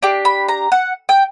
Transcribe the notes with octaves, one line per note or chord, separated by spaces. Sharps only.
D4 G4
B5
A#5
F#5
G5